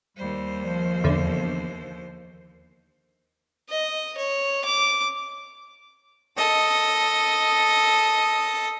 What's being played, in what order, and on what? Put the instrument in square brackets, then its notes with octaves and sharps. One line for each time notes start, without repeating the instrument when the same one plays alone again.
[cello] D#2 C5 [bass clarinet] G3
[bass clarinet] F3
[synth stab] E2 D3
[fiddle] D#5
C#5
D6
A4 D#5